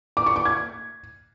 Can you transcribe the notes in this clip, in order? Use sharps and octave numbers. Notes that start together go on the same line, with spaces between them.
D6
C#6
D6
G#6